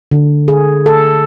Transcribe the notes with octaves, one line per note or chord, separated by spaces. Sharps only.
D3
G#4
A4